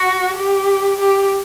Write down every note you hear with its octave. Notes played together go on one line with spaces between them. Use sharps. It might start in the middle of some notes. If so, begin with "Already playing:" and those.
Already playing: F#4
G4
G4